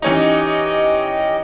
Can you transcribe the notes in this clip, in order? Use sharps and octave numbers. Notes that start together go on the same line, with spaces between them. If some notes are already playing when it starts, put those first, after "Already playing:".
E3 C#4 D#4 G4 D#5